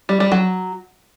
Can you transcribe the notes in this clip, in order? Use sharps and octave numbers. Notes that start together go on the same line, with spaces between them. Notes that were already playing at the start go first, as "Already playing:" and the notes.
G3
G3
F#3